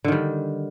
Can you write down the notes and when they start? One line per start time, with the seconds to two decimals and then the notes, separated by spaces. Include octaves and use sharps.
0.04 D3
0.08 D#3
0.12 G3